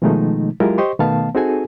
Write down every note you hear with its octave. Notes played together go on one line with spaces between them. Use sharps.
B2 D#3 F3 G#3 A3 D#4
F#3 G#3 E4 F4 G4 A#4
G4 C5 D#5 C6 C#6
B2 D#3 A3 B3 F5 A5
C4 D#4 F#4 G#4 A4 G#5